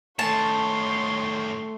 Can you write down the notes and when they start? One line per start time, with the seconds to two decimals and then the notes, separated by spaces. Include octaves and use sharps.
0.19 A2 D#3 A3 C#5 A5 C6